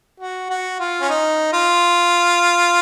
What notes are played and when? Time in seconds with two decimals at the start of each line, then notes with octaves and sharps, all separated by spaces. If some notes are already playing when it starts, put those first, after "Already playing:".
0.20 F#4
0.50 F#4
0.80 F4
1.01 C#4
1.09 D#4
1.53 F4